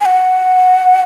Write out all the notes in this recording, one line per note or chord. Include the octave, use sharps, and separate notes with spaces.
G#5
F#5